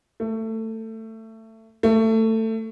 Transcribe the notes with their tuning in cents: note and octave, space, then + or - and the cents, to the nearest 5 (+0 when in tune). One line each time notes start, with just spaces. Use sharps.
A3 +20
A3 +20